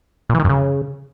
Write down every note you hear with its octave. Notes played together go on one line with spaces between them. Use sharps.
A#2
E3
D#3
F#2
C#3